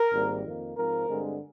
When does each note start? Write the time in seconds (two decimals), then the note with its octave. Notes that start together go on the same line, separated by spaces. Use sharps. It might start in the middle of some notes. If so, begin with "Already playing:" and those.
Already playing: A#4
0.11 G#1 G#2 G3 A#3
0.43 F2 D#3 A#3
0.75 G#2 F3 C4 A#4
1.08 G2 D3 G#3 C4